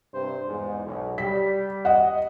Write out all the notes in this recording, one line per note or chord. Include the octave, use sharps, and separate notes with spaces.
G2 C3 C5
E2 G#2
B1
G3 B6
D#5 F#5